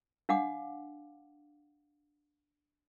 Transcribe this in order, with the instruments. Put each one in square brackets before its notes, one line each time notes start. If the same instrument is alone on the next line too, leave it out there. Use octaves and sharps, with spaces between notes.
[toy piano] D4 F5 F#5 D6